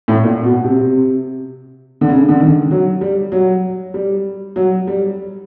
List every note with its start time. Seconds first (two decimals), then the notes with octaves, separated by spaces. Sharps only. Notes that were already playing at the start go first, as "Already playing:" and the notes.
0.08 A2
0.23 A#2
0.44 B2
0.64 C3
2.01 D3
2.09 C#3
2.29 D3
2.40 D#3
2.71 F#3
3.01 G3
3.32 F#3
3.94 G3
4.56 F#3
4.87 G3